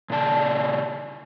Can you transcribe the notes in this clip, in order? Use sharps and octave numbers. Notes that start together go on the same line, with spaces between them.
A#2 C#3 D5 A5